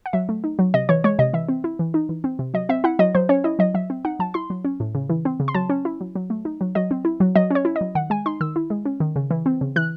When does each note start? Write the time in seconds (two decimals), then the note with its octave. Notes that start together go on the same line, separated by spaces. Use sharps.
0.06 F#5
0.13 F#3 E5
0.29 A3
0.44 D#4
0.59 F#3
0.74 C3 D#5
0.89 E3 C#5
1.04 G#3 C#5
1.19 C3 D#5
1.33 E3 E5
1.49 C4
1.64 E4
1.79 E3
1.94 D#4
2.09 E3
2.24 C4
2.39 C3
2.54 F#3 D#5
2.69 C4 E5
2.84 E4 F#5
2.99 F#3 D#5
3.15 F#3 C5
3.29 C#4 C#5
3.44 E4 D#5
3.59 F#3 D#5
3.74 F#3 E5
3.90 C4
4.05 D#4 F#5
4.19 F#3 A5
4.34 E4 C6
4.50 F#3
4.65 C#4
4.80 A2
4.95 C#3
5.10 E3
5.25 C4
5.40 C#3
5.48 C6
5.54 F#3 A5
5.69 C#4
5.85 E4
6.01 F#3
6.15 F#3
6.30 A3
6.45 D#4
6.61 F#3
6.75 F#3 D#5
6.91 C4
7.05 E4
7.20 F#3
7.36 F#3 D#5
7.51 C#4 C#5
7.65 E4
7.76 D#5
7.81 F#3
7.95 D#3 F#5
8.10 G#3 G#5
8.26 D#4 C6
8.41 D#3 E6
8.56 E4
8.70 G#3
8.85 C#4
9.00 D#3
9.16 C#3
9.31 E3
9.46 C4
9.61 C#3
9.76 E3 F#6